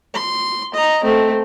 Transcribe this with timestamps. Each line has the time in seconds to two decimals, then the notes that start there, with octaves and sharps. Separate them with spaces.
0.14 C6
0.74 D#5 A#5
1.03 A3 C4